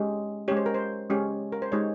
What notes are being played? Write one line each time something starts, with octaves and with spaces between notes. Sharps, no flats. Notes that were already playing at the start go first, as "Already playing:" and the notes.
Already playing: G#3 C#4 G4
G#3 C#4 G4 C#5
C5
A#4
C5
G#3 C#4 G4
A#4
C5
G#3 D#4 G4 C#5